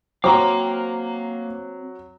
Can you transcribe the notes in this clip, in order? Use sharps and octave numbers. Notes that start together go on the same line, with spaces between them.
F#3 A#3 C4 F5 A#5 D6